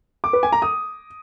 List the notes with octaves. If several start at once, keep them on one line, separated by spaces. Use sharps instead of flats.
D6
B4
G#5
A#5
D#6